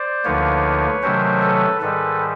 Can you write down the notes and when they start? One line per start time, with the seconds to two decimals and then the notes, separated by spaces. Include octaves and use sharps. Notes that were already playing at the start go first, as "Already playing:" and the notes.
Already playing: C5 D5
0.24 D2 D3 F3 A#3 D#4 B4 C#5
1.03 C3 D#3 F#3 A3 C#4 A#4 C5
1.42 A4 B4
1.81 G#2 D#3 G3 A4 B4